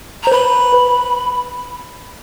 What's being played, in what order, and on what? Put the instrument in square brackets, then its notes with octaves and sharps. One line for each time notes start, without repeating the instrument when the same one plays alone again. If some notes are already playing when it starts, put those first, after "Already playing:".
[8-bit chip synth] C5 [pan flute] A#5
[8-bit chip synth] B4 [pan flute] B5